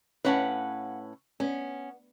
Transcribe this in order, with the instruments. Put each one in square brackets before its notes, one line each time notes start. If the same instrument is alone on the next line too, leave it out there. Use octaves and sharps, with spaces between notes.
[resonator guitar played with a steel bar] A2 C#4 B4 [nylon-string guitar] C#5 F5 F#5
[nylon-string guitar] B3 [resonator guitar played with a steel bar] C#4